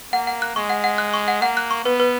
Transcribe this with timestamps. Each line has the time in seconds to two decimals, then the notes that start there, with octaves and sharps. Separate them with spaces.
0.12 A#3 F#5
0.27 F#5
0.42 F#6
0.56 G#3 C#6
0.70 F#5
0.84 F#5
0.98 F#6
1.13 C#6
1.28 F#5
1.42 A#3 F#5
1.57 F#6
1.71 C#6
1.85 B3 B4
2.00 B4